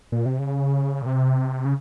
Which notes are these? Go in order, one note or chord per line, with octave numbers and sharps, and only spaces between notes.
A#2
C3
C#3
A#2
C3
C#3